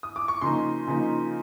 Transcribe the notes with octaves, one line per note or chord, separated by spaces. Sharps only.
D#6
D6
C#6
C#3 F3 A#3 D#4 C6
C#3 F3 A#3 D#4